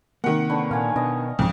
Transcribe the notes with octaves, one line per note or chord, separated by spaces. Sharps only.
C3 D#3 A#3 F#5
D3 B4 C#5
A#2 F5 G#5
B2 D4 D#5
C2 F2 G#2 C#3